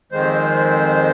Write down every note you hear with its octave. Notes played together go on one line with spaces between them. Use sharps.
F2 D#3 G#3 C5